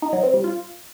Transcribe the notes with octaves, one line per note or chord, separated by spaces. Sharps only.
D#4
F#3
C4
G3
F4